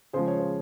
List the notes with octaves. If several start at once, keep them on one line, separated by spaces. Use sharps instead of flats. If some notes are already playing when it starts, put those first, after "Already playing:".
C#3 F3 G#3 G#4 C5
C#5
C5